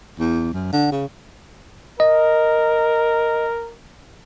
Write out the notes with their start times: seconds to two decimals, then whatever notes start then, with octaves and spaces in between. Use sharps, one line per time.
0.19 E2
0.53 F#2
0.73 D3
0.92 C#3
2.00 A#4 D#5